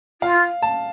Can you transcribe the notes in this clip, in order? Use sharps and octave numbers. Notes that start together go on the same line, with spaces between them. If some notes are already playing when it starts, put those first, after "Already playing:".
F4 F5
A5